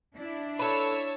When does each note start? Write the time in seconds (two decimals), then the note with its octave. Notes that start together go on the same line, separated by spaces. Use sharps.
0.17 D4 E4
0.59 A4 B4 C#5 A5 E6